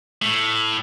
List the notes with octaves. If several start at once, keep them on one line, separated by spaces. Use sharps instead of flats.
A2